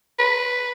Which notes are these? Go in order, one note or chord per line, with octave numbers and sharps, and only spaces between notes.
B4